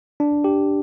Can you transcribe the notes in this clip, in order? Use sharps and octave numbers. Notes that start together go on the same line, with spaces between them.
D4
G4